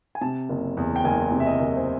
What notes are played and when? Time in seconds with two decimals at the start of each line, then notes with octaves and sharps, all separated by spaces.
0.15 G#5
0.21 C3 A5
0.50 F#1
0.77 E2
0.96 G5
1.04 F#1 G#5
1.32 C3
1.40 E5
1.46 D#5
1.60 F#1
1.77 C5